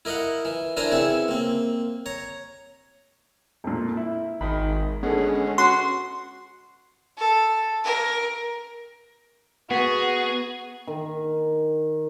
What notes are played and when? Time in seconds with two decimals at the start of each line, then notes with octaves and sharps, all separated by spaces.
0.05 E4 A#4 D#5 F5 F#5
0.45 E3
0.77 D4 E4 A#4 C5 G#5 A#5
0.92 C#3 E3 C4 E4 E5
1.28 A#3 C4
2.06 C#5 A#5
3.64 F2 A#2
3.97 E4
4.41 G#1 D#3 B5
5.03 D3 G#3 B3 C#4
5.58 F#4 C6
7.18 A4
7.85 A#4
9.71 B3 F#4 G#4
10.87 D#3